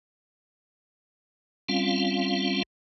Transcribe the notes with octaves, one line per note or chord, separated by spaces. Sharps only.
G3 C4 C#4 F4 F5